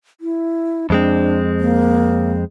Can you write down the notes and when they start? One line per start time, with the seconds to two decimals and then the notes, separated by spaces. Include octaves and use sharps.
0.21 E4
0.90 F2 G#3 C4 D4
1.60 A#3